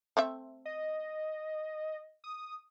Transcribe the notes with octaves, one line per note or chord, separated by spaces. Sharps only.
A3 C4 E5
D#5
D#6